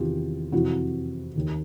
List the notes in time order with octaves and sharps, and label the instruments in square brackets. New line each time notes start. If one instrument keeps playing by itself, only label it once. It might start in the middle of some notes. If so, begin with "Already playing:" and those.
Already playing: [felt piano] E2 C3 D#3 F4 G4
F2 C3 E3 E4 F#4
D#2 D#3